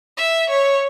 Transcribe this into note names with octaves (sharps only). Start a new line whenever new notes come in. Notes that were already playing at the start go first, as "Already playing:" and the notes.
E5
C#5